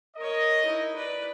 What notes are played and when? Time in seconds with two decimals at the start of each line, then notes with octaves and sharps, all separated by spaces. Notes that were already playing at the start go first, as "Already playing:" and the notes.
0.17 A#4 C#5 D#5
0.65 D#4 E4
0.96 B4 D5